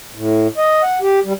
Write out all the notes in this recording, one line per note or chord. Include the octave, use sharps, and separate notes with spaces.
A2
D#5
F#5
G4
G3